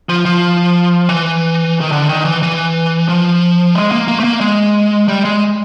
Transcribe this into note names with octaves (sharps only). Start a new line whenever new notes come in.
F3
F3
E3
D#3
D3
D#3
E3
E3
F3
G#3
A#3
A#3
A3
A#3
G#3
G3
G#3